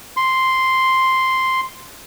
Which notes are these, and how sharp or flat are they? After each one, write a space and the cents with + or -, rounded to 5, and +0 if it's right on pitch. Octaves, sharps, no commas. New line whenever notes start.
C6 +0